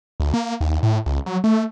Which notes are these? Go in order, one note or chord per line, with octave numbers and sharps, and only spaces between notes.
D2
A#3
D#2
A2
C#2
F#3
A3